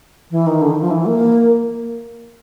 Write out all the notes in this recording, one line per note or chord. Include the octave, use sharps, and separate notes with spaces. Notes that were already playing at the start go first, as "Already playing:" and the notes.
E3
D#3
D3
D#3
F3
E3
A#3